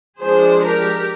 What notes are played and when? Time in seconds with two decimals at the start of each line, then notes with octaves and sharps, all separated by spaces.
0.20 F3 G#3 D4 G#4 C5
0.65 G4 A#4